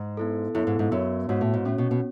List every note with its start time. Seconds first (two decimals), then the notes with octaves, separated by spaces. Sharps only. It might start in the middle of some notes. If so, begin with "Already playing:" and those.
Already playing: G#2
0.17 B3 E4 A4
0.55 F#2 B3 E4 A4
0.67 G#2
0.79 G#2
0.91 F#2 B3 F#4 C#5
1.29 G#2 B3 F#4 C#5
1.41 A2
1.54 G#2
1.65 A2 C#4 F#4 C#5
1.78 B2
1.91 B2